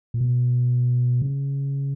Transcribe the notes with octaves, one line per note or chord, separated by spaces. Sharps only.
A#2
B2
C#3